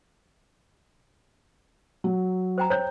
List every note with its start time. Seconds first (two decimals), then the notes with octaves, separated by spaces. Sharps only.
2.04 F#3
2.58 C5 G5 A#5
2.70 C5 C#5 G5 G6